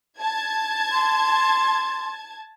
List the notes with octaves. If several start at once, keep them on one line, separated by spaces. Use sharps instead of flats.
A5 G#6
C6